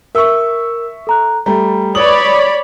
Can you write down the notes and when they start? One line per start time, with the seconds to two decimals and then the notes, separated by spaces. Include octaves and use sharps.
0.15 A#4 E5 C#6 E6
1.07 A4 A#5 F#6
1.46 G3 A3 A#5
1.95 B4 C#5 D5 B5 D#6 F#7